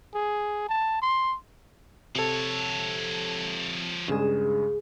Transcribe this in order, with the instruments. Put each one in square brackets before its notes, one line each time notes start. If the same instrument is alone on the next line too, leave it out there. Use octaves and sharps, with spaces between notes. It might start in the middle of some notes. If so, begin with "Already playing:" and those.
[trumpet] G#4
A5
C6
[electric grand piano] C3 A4 [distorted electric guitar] F3 C#5
[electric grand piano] G2 C#3 G#3 [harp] G#4 E7